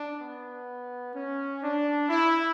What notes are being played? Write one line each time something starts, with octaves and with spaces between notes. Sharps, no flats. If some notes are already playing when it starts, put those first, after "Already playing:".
Already playing: D4
B3
C#4
D4
E4